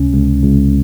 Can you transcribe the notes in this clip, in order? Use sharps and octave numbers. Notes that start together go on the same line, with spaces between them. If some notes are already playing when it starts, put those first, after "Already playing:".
Already playing: C#2 C3 C#4
C#2
C#2